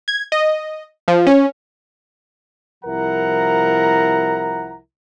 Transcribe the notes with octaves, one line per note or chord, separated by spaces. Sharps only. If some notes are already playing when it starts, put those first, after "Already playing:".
G#6
D#5
F3
C#4
C2 F3 E4 A#4 F#5 A#5